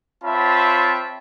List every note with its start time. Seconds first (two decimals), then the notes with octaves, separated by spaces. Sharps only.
0.24 C4 F4 C#5 E5 A5 B5